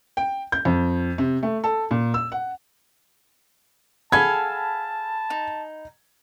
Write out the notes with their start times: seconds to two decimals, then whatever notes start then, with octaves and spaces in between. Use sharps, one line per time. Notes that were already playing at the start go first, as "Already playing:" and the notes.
0.17 G5
0.52 G6
0.65 F2
1.18 C3
1.43 A3
1.64 A4
1.91 A#2
2.14 E6
2.32 F#5
4.12 G#4 A4 F5 F#5 G#5 A5 B5 G#6
5.30 D#4